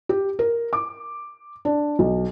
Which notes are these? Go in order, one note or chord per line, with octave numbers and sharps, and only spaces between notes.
G4
A#4
D6
D4
B1